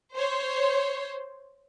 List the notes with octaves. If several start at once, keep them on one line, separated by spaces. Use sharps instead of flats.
C5 C#5